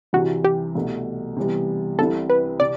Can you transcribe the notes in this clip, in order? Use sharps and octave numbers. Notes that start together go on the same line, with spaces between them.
C2 C3 E3 F#4
G4
C2 B2 A3
C3 E3 G3 B3
C2 C3 G3 C4 E4 A4
B4
C3 D5